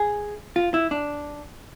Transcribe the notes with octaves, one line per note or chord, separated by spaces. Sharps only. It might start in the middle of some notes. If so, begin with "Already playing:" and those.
Already playing: G#4
F4
E4
D4